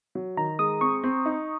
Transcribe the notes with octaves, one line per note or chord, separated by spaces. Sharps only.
F#3
D#3 A#5
G#3 D#6
C4 C#6
C4
D#4